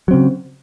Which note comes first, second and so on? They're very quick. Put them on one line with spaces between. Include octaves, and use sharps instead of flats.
F#3 C4 C#3